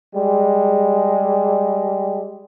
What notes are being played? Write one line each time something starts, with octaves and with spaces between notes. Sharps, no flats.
G3 G#3